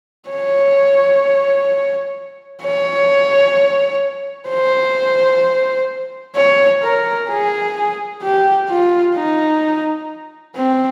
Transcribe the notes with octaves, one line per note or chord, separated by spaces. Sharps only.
C#5
C#5
C5
C#5
A#4
G#4
G4
F4
D#4
C4